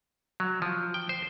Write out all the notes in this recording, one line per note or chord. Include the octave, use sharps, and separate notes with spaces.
F#3
F3
G5
C5